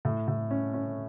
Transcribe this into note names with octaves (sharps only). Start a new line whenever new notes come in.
A2
A2
C#4
C#4